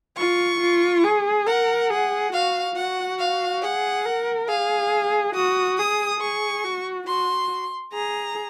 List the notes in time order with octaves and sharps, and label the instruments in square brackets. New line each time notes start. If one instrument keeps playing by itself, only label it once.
[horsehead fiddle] F4 [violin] C#6
[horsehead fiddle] F4
G#4
[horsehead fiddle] A#4 [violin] F#5
[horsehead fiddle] G#4 [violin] F#5
[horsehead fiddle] F#4 [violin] F5
[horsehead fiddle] F#4 [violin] F#5
[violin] F5
[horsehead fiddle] G#4 [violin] F#5
[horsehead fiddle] A#4
[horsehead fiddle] G#4 [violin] F5
[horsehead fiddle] F#4 [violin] D#6
[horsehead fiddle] G#4 [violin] D#6
[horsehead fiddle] G#4 [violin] C#6
[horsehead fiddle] F#4
[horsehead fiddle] F#4 [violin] C6
[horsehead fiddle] G#4 [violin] A#5